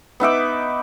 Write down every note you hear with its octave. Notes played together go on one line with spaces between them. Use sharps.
B3 D#4 E5 D6